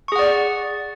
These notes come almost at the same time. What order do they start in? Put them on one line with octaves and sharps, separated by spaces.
C#6 G#4 F#5 D5